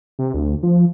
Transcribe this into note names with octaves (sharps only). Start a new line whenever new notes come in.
C3
D2
F3